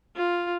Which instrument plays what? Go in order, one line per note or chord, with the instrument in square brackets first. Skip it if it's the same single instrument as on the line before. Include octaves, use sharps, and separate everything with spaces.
[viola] F4